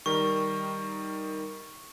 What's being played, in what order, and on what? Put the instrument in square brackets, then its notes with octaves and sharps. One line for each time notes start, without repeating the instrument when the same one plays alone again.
[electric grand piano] D#3 G3 A#4 [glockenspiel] C#6